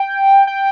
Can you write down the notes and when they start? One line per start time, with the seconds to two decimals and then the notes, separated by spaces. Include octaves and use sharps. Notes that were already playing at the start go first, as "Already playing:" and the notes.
Already playing: G5
0.47 G5